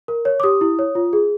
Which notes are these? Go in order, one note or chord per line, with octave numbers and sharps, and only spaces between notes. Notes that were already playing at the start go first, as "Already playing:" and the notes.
A#4
C#5
D6
G4 D#6
E4
C#5
F4
G#4